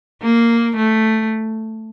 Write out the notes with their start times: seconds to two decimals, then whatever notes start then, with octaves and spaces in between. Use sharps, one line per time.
0.22 A#3
0.77 A3